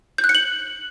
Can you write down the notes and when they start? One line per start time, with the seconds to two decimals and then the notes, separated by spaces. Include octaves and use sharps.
0.18 G6
0.24 F#6
0.29 C#7
0.35 F#7